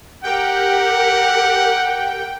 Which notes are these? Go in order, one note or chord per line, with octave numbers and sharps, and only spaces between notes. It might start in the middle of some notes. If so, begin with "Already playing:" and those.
G4 A#4 F#5 G5